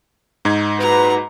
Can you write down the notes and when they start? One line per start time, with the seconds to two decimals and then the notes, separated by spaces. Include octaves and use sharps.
0.45 G#2 D#4 G#6
0.80 A#2 F#4 B4 A#5